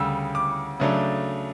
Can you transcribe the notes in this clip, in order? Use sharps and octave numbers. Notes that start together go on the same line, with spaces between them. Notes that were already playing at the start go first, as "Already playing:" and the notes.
Already playing: D2 C#3 G3 E6
D6
C#3 F#3 A3 D4